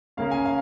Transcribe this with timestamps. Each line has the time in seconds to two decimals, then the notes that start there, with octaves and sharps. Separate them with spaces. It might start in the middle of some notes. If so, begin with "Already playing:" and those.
0.17 C#3 A#3 C#4 F5
0.31 G#5
0.46 F5